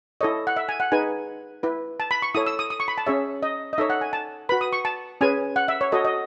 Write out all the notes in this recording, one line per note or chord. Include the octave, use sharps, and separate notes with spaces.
E4 A4 C#5 D#5
F#5
E5
G#5
F#5
D#4 G#4 B4 G#5
E4 B4
A5
B5
C#6
E4 A4 C#5 D#6
E6
D#6
D#6
C#6
B5
A5
C#4 G#4 C#5 E5
D#5
D#5
D#4 A4 C#5 E5
F#5
G#5
A5
F#4 B4 B5
D#6
C#6
A5
C#4 G#4 B4 G#5
F#5
E5
C#5
F#4 A4 C#5 D#5
D#5